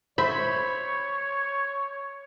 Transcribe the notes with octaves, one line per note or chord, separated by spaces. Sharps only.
C5 C#5 E5 B5